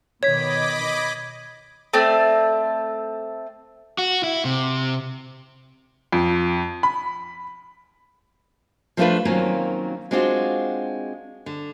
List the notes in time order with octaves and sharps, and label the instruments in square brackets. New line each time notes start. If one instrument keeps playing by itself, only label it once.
[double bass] B2 D#3 [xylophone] C#5 [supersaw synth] D#5 B5 D6 [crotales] G#6 B6
[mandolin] A3 C4 D5
[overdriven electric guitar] F#4
E4
C3
[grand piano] F2
B5
[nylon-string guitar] F3 A3 B3 D4 F4 B4
D#3 F#3 A#3 C4 C#4 F4
G#3 C4 D4 F4 F#4
D3